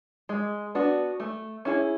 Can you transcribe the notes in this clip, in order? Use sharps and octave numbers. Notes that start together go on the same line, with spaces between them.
G#3
B3 D4 F#4
A3
C#4 E4 G#4